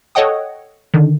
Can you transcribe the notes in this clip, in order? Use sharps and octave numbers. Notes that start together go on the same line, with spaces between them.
A4 C#5 D#5 F#5 G5 D#6
D3 D#3